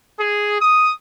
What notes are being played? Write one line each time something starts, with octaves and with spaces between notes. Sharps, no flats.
G#4
D#6